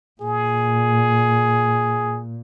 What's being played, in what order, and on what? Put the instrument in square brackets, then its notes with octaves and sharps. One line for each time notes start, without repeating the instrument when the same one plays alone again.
[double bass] A#2 [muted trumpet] G#4